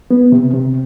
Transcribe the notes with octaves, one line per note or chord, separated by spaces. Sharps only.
B3
C3
C3